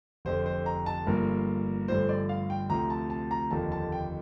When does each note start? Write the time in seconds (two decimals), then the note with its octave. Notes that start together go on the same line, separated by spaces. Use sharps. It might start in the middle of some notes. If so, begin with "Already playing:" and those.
0.25 F1 F2 D3 C5
0.46 C5
0.66 A#5
0.86 A5
1.07 G1 G2 F3 A#3 A#4
1.88 G1 G2 D3 F3 A3 C5
2.09 D5
2.29 F5
2.50 G5
2.69 D2 C3 F3 C4 A#5
2.90 A5
3.10 A5
3.31 A#5
3.51 F1 D#2 D3 F3 A#3 A5
3.72 A5
3.92 G5